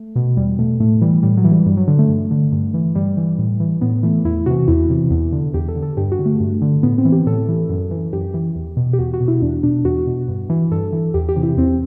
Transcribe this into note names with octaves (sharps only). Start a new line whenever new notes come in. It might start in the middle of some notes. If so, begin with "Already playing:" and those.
Already playing: A3
B2
E2 G3
B2 A3
A2 A3
E3 G3
A2 G3
F#3
E3
G3
G2 G3
F#3
D3
A3
G2
D3
G2
E3
G2 G3
E3
A2
E3
A2 B3
E3 A3
E2 E4
C3 E3 F#4
E2 E4
C3 E3
E2
D3
E2 G4
A4
D3
A4
G2 G4
F#4
D3
A3
G2
D3
A2 B3
C4
E3
G4
A2 A4
E3
F#2
E3
F#2 G4
E3
E2
B2
G4
E2 F#4
F#4
B2
E4
E2 D4
B2 D4
E2 F#4
B2
G2
E3
G2 A4
E3
E2 G4
G4
C3 E3
E4
E2 C4